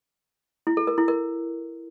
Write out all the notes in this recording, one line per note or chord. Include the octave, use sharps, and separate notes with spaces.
E4
A4
A#4
E4
A#4